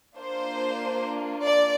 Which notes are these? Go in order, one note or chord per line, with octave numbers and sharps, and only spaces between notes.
A#3 D4 F4 C5
D5